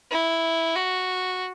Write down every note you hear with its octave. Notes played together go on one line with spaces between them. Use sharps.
E4
F#4